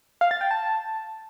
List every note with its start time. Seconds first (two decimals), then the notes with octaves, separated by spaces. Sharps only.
0.21 F5
0.31 A6
0.41 G5
0.51 A5